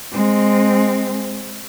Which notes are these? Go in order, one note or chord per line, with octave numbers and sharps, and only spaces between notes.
G#3 C4